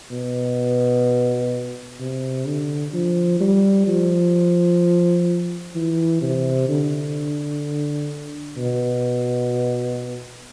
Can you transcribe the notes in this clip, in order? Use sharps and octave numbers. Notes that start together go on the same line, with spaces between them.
B2
C3
D3
F3
G3
F3
E3
C3
D3
B2